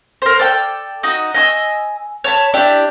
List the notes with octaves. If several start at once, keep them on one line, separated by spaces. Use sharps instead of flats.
A#4 C5
A4 D5 G5
D#4 F#4 D#5
D#5 G#5 E6
C#5 A5 B5
D4 E4 G4 D5